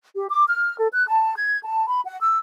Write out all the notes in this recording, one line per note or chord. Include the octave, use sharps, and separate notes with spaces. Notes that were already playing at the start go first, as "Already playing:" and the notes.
G4
D6
F6
A4
F#6
A5
G#6
A5
B5
F#5
E6